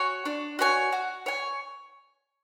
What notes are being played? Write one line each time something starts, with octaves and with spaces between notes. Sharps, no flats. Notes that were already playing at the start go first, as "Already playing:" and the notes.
Already playing: F#4 C#5 G#5
D4
F#4 C#5 G#5
F#4
C#5 G#5